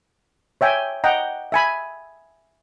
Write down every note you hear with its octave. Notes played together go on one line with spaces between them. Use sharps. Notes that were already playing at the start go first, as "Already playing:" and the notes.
C#5 E5 G5 G#5
D#5 F#5 G5 A#5
E5 G#5 B5